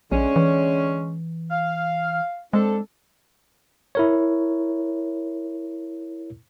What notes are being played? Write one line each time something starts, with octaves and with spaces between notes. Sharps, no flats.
A#1 D3 G#3 C#4
E3
F5
G#3 C4 D4 A4
E4 A#4 C#5